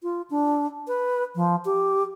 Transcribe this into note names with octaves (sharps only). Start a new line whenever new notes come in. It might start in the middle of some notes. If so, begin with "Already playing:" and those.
F4
D4
B4
F3
G4